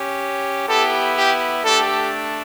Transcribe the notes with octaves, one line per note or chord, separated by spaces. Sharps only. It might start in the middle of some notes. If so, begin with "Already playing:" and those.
Already playing: C#4 G4
B3 E4 G4 A4
G4
A3 D4 G4 A4